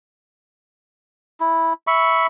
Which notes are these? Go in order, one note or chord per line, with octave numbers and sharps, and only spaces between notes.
E4
E5 B5 C#6